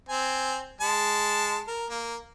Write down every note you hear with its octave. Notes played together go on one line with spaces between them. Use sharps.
C4 G#5
G#3 A5
A#4
A#3